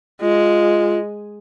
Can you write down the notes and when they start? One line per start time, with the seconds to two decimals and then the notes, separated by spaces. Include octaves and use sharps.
0.21 G#3 F4